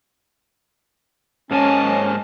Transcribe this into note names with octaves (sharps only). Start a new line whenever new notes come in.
G#2 A#3 C#4 D#5 G#5 A5